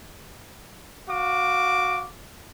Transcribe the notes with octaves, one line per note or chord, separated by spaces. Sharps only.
F#4 F5 D6